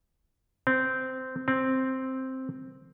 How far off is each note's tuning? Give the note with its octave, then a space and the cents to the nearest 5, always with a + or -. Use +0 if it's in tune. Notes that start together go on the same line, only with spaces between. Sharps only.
C4 -15
C4 +0